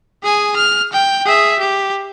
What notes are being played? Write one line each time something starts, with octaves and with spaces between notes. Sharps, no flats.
G#4 G#5
F6
G5
G#4 E5
G4